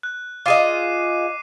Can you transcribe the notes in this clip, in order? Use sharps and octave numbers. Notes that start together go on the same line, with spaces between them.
F#6
F4 G#4 D#5 D6 C7 D#7